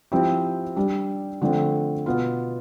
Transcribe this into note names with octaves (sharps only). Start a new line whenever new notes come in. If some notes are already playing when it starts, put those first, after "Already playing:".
F3 C4 E4 G4
G3 D4 G4
D3 F3 A3 C4
B2 B3 F4